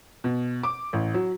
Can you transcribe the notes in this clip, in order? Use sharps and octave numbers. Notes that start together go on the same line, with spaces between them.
B2
D6
A1
F#3